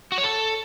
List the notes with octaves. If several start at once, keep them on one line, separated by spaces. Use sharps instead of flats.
F#4
C#5
A4